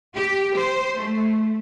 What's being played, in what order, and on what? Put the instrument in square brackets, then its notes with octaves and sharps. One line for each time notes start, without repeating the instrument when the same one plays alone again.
[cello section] G4
C5
A3